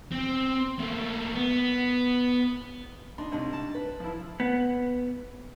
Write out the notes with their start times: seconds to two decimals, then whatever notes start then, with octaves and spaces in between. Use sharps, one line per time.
0.12 C4
0.79 A3 A#3
1.35 B3
3.18 D4 D#4 C6
3.32 C2 G#2 G3 D4 D#5
3.53 A5
3.75 B4
4.00 F3 E4
4.40 B3